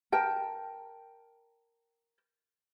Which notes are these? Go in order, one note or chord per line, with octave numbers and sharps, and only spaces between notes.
A#4 G5 A5